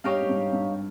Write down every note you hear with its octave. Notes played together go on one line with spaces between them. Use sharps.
G2 D#4 G4 C#5 F5
G#2
G2
G2